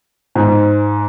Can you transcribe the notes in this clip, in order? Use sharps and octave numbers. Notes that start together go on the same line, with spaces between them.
G#2